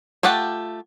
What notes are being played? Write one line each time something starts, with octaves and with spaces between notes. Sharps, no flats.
A3 F4 G4 F#5 A5